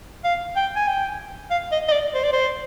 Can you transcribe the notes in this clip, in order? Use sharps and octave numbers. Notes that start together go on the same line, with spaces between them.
F5
G5
G#5
G5
F5
D#5
D#5
D5
C5
D5
C5